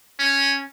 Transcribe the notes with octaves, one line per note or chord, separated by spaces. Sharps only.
C#4